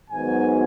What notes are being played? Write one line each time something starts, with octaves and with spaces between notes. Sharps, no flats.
G#2 D#3 F#3 B3 G#5